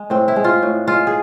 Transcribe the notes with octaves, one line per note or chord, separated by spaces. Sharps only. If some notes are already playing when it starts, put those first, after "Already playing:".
Already playing: G#3
A2 C4
E4
G#3
F4
A2
G#3 F4
G#4